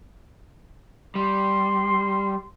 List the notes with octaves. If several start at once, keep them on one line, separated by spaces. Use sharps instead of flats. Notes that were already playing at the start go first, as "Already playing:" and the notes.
G3 C6